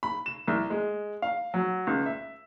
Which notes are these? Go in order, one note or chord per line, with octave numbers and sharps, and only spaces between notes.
B5
E7
C2
G#3
F5
F#3
C#2
E5